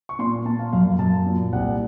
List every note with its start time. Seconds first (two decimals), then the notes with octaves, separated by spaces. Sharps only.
0.09 C#6
0.19 A#2 C6
0.45 A#2 A5
0.59 F5
0.73 F#2 F5
0.99 F#2 A5
1.26 A#2
1.53 C2 F#5